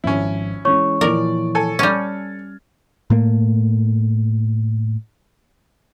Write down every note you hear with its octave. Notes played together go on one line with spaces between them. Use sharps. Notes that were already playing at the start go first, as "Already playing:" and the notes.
G#1 F3 C#4 E4
E3 G#3 C#4 C#5 C#6
A#2 E3 F3 A#4 D5
A4 G#5
G3 C#4 F6 G#6 A6
A2 A3 A#3